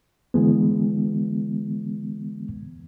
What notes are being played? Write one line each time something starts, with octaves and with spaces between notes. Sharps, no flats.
D3 E3 G#3 B3